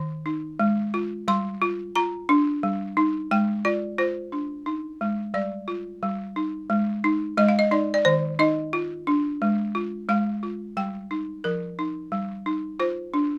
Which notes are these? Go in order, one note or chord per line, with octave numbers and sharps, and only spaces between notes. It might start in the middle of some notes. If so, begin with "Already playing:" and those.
Already playing: D#3
D#4
G#3
F4
G3 C6
F4
F4 A#5
D4
G3
D#4
G#3 G5
F4 D5
F4 C5
D4
D#4
G#3
G3 D5
F4
G3
D#4
G#3
D#4
G#3 D#5
F5
D#5
D#4 D5
D5
D#3 C5
D#4 D#5
F4
D4
G#3
F4
G#3 F5
F4
G3 G5
D#4
F3 A#4
D#4
G3
D#4
F4 C5
D4